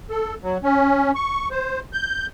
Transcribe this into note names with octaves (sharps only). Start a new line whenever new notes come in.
A4
F#3
C#4
C#6
C5
G6